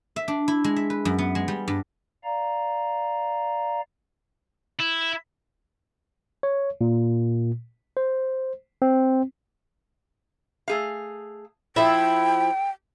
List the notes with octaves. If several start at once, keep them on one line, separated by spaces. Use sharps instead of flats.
E5
D4
E4
G#3
E5
B4
F#2
B3
G#3
G3
G2
D5 F5 A#5
E4
C#5
A#2
C5
C4
A3 G#4 F5
F3 E4 A4 E5 G5